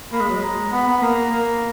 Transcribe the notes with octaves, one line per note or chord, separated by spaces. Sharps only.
A#3 B5
G#3
F#3
G#3
A#5
B3 B5
B3
A#3 A#5
A#3